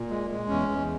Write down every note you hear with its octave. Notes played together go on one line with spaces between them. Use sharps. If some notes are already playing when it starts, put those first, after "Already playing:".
Already playing: A#2
G#3
G#3
E2 C#4
E2